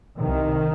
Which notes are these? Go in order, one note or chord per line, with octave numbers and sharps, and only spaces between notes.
C2 C3 D#3